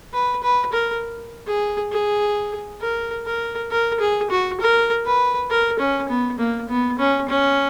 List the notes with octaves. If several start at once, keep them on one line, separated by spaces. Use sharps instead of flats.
B4
B4
A#4
G#4
G#4
A#4
A#4
A#4
G#4
F#4
A#4
B4
A#4
C#4
B3
A#3
B3
C#4
C#4